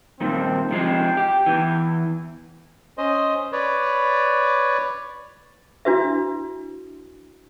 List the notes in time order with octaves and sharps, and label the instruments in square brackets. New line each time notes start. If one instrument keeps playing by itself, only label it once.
[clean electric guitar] G2 A#2 D#3 [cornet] C4
[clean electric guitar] C3 F3 G#3 [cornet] G5
[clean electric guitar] G4
E2 G#2 E3
[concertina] C#4 C5 D#5
B4 C#5 D5
[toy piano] D4 E4 F#4 B4 E5